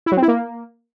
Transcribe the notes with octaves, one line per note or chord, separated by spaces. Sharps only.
E4
F#3
C4
E4
A#3